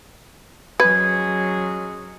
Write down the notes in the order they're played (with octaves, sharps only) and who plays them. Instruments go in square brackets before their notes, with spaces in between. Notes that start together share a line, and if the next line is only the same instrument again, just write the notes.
[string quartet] F#3 [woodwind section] G#3 C#4 G#4 [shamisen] B4 [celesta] G#6